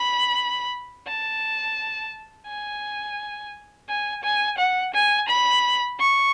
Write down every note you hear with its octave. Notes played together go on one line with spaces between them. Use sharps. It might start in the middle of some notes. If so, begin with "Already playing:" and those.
Already playing: B5
A5
G#5
G#5
G#5
F#5
G#5
B5
C#6